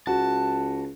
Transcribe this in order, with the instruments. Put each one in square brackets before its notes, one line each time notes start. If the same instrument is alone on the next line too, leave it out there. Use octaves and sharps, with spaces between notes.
[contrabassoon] C#2 [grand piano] F#4 [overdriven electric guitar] A5